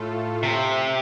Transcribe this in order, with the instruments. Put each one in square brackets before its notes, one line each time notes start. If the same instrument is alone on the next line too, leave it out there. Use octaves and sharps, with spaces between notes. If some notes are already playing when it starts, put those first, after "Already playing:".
Already playing: [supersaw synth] A2 A3 F4 A4
[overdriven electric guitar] C3